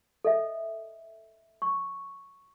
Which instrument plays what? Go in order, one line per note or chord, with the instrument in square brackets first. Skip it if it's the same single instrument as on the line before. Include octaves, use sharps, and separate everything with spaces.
[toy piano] A4 D#5 E5
C#6